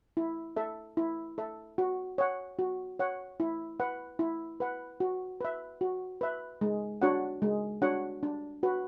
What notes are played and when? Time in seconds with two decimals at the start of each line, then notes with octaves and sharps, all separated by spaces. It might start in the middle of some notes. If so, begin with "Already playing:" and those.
0.17 E4
0.56 A4 E5
0.97 E4
1.38 A4 E5
1.78 F#4
2.18 C#5 F#5
2.59 F#4
2.99 C#5 F#5
3.40 E4
3.80 B4 F#5
4.19 E4
4.60 B4 F#5
5.00 F#4
5.41 B4 E5
5.81 F#4
6.21 B4 E5
6.61 G#3
7.02 D4 F#4 C#5 F#5
7.42 G#3
7.82 D4 F#4 C#5 F#5
8.23 D4
8.63 F#4 B4